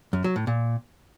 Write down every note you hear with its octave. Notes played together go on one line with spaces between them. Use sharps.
F#2
F#3
A2
A#2